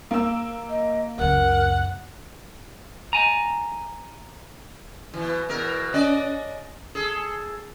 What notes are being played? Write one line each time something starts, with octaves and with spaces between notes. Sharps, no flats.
A#3 E6
D#5
C#2 F#2 A#4 F#5
G#5 A#5
B2 E3
E2 B2 A#4
C#4 D5 D#5
G#4 A4